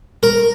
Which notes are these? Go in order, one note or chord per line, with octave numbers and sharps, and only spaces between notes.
A#4